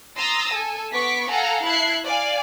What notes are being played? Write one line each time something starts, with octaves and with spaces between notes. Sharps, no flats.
A#5 C6 D#6 E6 A6 A#6
A4 G#5
B3 C#6 D6 B6
A4 F5 F#5 G#5 A#5
E4 A5 F#6 G#6 C7
D5 F5 G#5